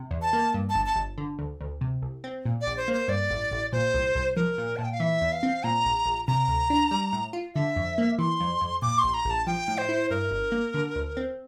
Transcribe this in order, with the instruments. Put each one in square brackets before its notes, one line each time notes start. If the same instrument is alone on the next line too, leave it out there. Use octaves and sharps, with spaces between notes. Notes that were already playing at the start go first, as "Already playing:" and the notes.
Already playing: [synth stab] C3
E2
[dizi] A5
[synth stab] A#3
G2
[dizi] A5
[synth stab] G1
[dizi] A5
[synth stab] G1
D3
D2
D2
C3
C2
C4
A#2
[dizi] D5
[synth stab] A#1
[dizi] C5
[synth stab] A#3
[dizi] C5
[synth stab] G2 [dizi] D5
[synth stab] A1
A1
[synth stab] A#2 [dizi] C5
[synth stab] C2
C2
[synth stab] F3 [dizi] A#4
[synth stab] A#2
[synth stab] A#2 [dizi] A5
[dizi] G5
F5
[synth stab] E3 [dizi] E5
[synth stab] E2
[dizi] F5
[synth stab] C4
[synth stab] A#2 [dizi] A#5
[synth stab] A#1
A#1
[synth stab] C3 [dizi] A#5
[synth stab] D2
D4
G3
A2
F4
[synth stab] D3 [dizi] E5
[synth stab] F2
A#3
[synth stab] E3 [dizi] C6
[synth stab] F2
F2
[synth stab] A#2 [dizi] D6
[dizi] C6
[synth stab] A#1
[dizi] A#5
[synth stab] A#1
[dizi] A5
[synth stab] F3 [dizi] G5
[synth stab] A2
[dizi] C5
[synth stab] E4
[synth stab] G2 [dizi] A#4
[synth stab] G1
A#3
D3
D2
C4